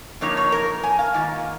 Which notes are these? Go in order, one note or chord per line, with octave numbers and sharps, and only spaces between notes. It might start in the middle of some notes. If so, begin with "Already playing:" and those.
F2 C#3 A#3 D#4 C#5
C#5
A#4
G#5
F5
G#2 D#3 A#3 F4